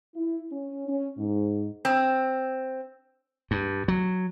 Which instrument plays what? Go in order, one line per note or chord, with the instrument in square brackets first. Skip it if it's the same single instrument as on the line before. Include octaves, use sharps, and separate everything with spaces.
[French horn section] E4
C#4
C#4
G#2
[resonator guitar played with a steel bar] C4
[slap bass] G2
F#3